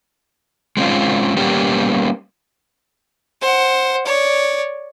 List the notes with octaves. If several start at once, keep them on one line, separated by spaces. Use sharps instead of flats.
G#3 C4 C#4 F4
G3 A#3 B3 C#4 G4
C5 F#5
C#5 D5